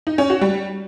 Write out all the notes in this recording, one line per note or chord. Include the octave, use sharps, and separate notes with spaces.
D#4
C#4
F#4
G3